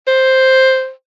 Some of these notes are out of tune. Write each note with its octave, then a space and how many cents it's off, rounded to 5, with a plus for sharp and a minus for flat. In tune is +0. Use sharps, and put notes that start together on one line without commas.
C5 +5